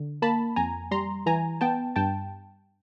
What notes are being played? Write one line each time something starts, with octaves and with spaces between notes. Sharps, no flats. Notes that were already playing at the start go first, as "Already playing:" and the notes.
Already playing: D3
A#3 A5 B5
F2 G#5 A#5
G3 A#5 C6
E3 G#5 A#5
B3 G5 A5
G2 G5 A5